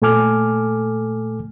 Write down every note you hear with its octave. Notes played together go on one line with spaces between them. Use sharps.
A#2 A3 A4 G#5 D6 F6